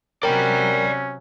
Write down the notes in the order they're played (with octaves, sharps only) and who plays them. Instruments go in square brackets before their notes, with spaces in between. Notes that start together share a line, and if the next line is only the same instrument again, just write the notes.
[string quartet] C3 F#3 [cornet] C#4 [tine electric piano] A#4 G5 [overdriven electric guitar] D5 B5